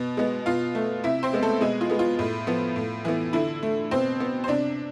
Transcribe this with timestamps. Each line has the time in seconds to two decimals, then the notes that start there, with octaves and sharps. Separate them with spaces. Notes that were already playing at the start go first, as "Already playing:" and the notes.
Already playing: B2
0.17 G#3 B3
0.46 B2 F4 F5
0.75 A3
1.04 C3 E4 E5
1.23 C4 C5
1.33 G#3 B3
1.43 A3 A4
1.61 B2 G#3 G#4
1.81 F4
1.90 G#3 B3
1.99 F4
2.19 A2
2.47 F3 B3
2.76 A2
3.05 E3 B3
3.33 D3 E4
3.63 A3
3.91 B2 C4 C5
4.20 B3
4.44 C5
4.48 C3 D4 D5